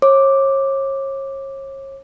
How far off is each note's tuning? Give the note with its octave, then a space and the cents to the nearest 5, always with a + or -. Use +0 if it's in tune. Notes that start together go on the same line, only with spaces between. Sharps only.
C#5 -35 D6 +0